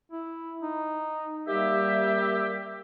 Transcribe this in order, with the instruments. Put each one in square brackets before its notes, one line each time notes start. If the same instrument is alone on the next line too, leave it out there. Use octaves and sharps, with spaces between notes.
[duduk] E4
D#4
[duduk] G3 [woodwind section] A#3 G4 E5